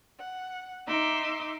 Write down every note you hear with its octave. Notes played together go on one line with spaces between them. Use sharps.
F#5
D#4 E5 C6 D6